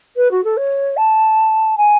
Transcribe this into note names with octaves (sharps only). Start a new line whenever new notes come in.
B4
F#4
A4
C#5
A5
G#5